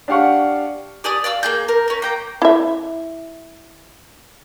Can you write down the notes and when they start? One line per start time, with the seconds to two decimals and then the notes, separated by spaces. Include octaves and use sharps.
0.08 D4 G4 F5 F#5 C#6
1.04 G4 D5 G#5 D#6
1.24 D5 F5 D6 E6
1.43 A#3 G#4 G6
1.68 A#4
1.88 C#4 A#4
2.02 A#3 G5 A#5
2.42 E4 E5